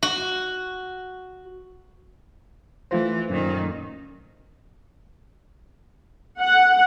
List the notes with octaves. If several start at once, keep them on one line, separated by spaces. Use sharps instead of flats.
F#4
E3 A3 F4 C5
F#2 A#2 D#3
F#5